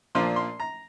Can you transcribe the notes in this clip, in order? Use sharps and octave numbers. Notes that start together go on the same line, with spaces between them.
A#2 F3 A#3 D4 C6
C6
A#5